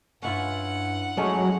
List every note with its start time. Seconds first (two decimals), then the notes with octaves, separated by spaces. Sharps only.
0.22 G2 C#4 E4 F4 F#5
1.17 F#3 G#3 A3 C#4